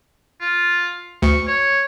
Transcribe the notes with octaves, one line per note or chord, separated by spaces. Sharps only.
F4
D2 C#6
C#5